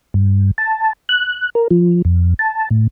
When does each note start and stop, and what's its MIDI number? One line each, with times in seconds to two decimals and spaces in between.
0.14 0.51 43
0.58 0.93 81
1.09 1.50 90
1.55 1.68 70
1.71 2.02 53
2.05 2.34 41
2.39 2.69 81
2.71 2.87 45